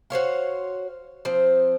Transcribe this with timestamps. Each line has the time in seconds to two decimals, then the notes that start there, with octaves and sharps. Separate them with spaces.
0.10 F#4 C5 C#5 F5
1.25 F3 C4